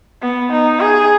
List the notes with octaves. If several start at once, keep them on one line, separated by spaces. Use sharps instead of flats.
B3
D#4
G#4